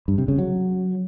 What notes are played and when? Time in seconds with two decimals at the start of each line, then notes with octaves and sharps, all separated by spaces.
0.08 G2
0.18 C3
0.28 C#3
0.38 F#3